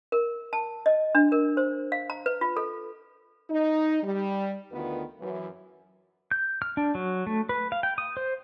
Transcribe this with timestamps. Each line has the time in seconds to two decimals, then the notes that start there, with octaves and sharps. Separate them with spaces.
0.12 A#4
0.53 A5
0.86 D#5
1.15 D4
1.32 A#4
1.57 C5
1.92 F5
2.10 A#5
2.26 B4
2.41 F4
2.57 A4
3.50 D#4
4.03 G3
4.72 D2 D3 D#3 B3 F4 B4
5.20 F#2 E3
6.31 G6
6.62 F6
6.77 D4
6.95 F#3
7.27 A3
7.49 B4
7.72 F5
7.83 G5
7.98 D#6
8.17 C5